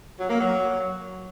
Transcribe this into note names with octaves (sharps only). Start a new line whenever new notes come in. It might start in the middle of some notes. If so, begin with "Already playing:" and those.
F#3
A#3
F#3